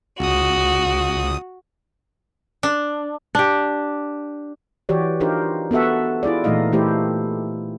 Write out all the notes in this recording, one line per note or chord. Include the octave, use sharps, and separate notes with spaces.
C#2 F#4 D#6
D4
D4 G4
E3 F#4 G4 C#5 D5
D4 D#4 F4 G4 A#4 C5
B3 F#4 A4 E5 F#5
E4 F4 G#4 D5
A#2 E3 A3 D#4 D#5 F5
E3 A3 E4 G4 C5